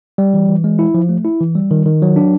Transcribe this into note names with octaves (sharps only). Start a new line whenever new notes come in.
G3
E3
E3
G#3
E4
F3
A3
E4
E3
G3
D#3
D#3
F#3
D4